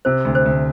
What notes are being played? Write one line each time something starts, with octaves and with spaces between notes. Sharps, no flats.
C3 C5
D2
C5
D2